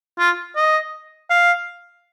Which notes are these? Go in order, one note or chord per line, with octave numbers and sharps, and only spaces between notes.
F4
D#5
F5